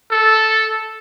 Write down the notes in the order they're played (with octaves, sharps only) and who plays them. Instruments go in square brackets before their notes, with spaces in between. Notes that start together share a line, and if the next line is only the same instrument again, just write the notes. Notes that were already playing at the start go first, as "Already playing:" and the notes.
[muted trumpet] A4